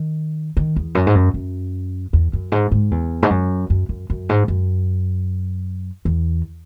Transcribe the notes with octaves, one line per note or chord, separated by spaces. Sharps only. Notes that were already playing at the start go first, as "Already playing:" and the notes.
Already playing: D#3
D#3
E2
F#2
G#2
F#2
F#2
E2
F#2
G#2
G#2
E2
G#2
F#2
F#2
F#2
F#2
G#2
F#2
E2